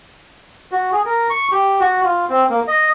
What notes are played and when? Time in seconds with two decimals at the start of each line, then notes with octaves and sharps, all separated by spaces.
0.72 F#4
0.92 G#4
1.06 A#4
1.30 C#6
1.52 G4
1.80 F#4
2.04 F4
2.29 C4
2.50 A#3
2.67 D#5